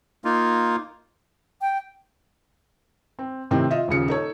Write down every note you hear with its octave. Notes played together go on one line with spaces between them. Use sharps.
A#3 D#4 F4
G5
C4
A2 C3 D#3 C4
F4 D#5 E5
D#1 A#2 C#3 C#7
D#4 A4 C#5